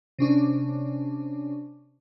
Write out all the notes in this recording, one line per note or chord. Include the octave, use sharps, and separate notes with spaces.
C3 C#4 D4